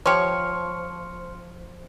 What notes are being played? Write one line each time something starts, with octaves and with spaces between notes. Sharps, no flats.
F3 G4 C#5 C6 F6 C#7